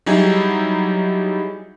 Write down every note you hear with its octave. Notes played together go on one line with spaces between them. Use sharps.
F#3 G3 D#4 E4 G#4